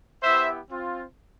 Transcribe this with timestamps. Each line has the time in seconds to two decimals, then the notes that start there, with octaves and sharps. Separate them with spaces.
0.22 B3 E4 G4 C5 E5
0.68 C4 F4